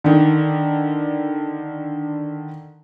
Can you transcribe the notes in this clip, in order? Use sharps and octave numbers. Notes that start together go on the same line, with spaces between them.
D3 D#3